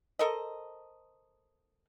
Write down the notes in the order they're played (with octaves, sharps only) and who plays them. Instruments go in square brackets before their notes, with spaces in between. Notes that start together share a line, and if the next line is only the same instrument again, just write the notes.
[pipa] A4 A#4 C5 D#5